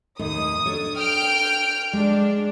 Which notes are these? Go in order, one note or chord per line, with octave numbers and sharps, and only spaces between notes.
D#2 A2 D#4 D#6
D4 A4 C#5
G5 F6 D7
G#3 D4